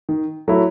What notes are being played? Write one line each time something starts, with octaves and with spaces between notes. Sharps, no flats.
D#3
F#3 A3 E4